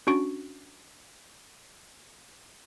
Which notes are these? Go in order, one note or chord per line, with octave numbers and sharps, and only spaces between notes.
C#4 D4 F#4 C#6 D7